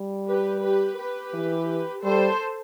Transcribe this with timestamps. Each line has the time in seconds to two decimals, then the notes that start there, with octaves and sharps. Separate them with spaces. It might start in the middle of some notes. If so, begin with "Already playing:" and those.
Already playing: G3
0.28 G4 B4
0.63 G4 B4
0.98 G4 B4
1.34 E3
2.04 G3 A4 C5